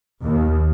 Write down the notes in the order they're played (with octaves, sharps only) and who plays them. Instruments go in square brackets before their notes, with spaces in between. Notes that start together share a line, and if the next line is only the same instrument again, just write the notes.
[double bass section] D#2